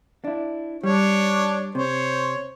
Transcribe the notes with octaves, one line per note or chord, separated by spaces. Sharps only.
D4 E4
G3 D4 C#5
C3 C5 C#5